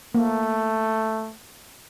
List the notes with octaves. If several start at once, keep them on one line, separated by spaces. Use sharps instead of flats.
A3 A#3